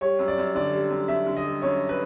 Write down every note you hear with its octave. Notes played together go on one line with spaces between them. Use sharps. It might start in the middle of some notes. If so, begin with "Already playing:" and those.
G3 C#5
F#2
D5
F#2
D3 D5
G3
F#2
F#2 E5
D3
D#5
G3
F#2 C#5
B4